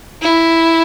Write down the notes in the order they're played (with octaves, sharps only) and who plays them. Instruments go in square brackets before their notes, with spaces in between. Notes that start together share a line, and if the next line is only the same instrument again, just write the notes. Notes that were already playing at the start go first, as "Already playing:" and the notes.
[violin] E4